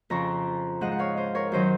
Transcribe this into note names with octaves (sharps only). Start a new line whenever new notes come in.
F2 C#3 F3 A#5 C#6
G#2 F3 D#5 F#5
F#5
C#5 F5
C5 D#5
A#4 C#5
F#2 D#3 F#3 C5 D#5